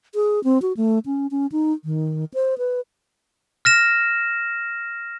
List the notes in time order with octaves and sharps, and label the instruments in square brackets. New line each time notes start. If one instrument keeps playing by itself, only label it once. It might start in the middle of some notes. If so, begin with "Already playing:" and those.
[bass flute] G#4
C4
F#4
A3
C#4
C#4
D#4
D#3
C5
B4
[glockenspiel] F6 A#6 E7